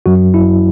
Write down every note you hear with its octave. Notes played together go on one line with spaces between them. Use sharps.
F#2 F#3 F#4
E4